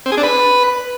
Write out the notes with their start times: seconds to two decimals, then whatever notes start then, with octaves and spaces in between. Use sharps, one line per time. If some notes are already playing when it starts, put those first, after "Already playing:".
0.06 C4
0.12 G#4
0.17 D4
0.23 B4